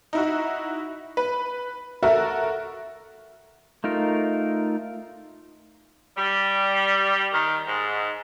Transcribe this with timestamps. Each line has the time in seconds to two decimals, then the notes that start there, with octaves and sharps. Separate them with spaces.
0.13 D#4 E4 F#4
1.17 B4
2.03 F#4 A4 A#4 E5
3.84 A3 D#4 F4 A#4
6.16 G3
7.32 D#3
7.66 G#2